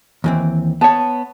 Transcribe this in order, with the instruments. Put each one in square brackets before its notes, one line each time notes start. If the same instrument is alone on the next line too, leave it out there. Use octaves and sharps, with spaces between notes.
[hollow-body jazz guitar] D#2 E3 C4
[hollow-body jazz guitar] B3 C#5 [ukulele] A5